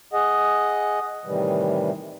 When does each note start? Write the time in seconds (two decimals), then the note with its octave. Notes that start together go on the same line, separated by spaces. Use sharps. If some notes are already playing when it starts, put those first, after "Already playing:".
0.13 G#4 D#5 F#5
1.25 A2 C3 D#3 E3 G3